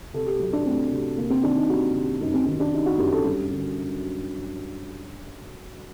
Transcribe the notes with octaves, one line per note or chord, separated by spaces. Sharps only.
C3 A4
G4
F#3
D4
A3 C4
C3
C3 A#3
C4
D#3 D4
D#4
G3 F#4
C3
F#2 D#4
C4
D#3 C4
D4
G3 D#4
F#4
F#2 G4
A4
G2 G4
D3